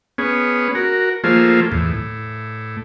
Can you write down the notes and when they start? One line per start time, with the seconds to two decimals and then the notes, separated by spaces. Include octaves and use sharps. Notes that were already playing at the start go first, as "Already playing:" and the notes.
0.18 B3 C#4 G#4
0.75 F#4 A#4
1.24 F3 A3 A#3 F4 G#4 C5
1.72 E2 A2
1.94 A2